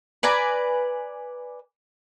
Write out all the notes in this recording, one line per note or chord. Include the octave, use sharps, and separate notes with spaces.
B4 D5 G#5 A#5